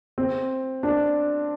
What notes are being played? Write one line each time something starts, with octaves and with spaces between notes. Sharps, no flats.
C4
D4